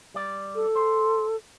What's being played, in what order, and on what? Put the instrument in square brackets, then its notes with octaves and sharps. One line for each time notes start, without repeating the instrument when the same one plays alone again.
[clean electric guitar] G3 D5
[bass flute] A4
[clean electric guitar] C5